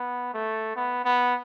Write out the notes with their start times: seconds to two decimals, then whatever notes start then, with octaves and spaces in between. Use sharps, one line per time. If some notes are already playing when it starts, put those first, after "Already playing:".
Already playing: B3
0.34 A3
0.76 B3
1.05 B3